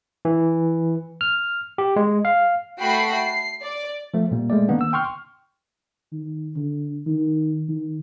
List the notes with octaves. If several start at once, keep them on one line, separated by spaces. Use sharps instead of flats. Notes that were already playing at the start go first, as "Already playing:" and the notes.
E3
F6
G4
G#3
F5
A3 F#4 G5 B5 C7
C7
D5
F3 A3
A#2 G3 A#3
G#3 A3 D5
D#3 A#3 B3 D4
E6
G5 C6 C#6 F6
D#3
D3
D#3
D#3